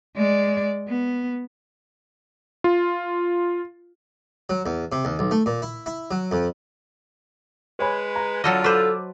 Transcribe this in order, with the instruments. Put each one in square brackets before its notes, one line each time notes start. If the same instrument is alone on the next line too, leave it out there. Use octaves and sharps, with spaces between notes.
[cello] G#3 D5
B3
[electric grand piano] F4
[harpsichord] F#3
E2
C3
D#2
B1
A3
A#2
E4
E4
F#3
F2
[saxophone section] G#3 B4 [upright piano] C#5 G#5 B5
[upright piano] A#5
[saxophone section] D3 F4 [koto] F#3 A4 D#5
[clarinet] A4 [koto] B4 C5 [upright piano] D6 E6 F#6